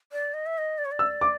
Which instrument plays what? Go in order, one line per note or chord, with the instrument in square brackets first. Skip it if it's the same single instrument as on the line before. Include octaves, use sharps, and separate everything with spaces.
[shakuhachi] D5
D#5
E5
D#5
D5
C#5
D5
[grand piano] E6
D6